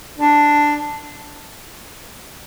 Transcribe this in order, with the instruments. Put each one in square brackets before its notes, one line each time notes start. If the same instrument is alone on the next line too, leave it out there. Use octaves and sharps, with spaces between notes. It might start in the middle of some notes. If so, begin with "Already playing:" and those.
[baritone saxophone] D4